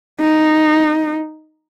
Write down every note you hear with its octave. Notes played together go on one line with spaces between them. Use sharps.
D#4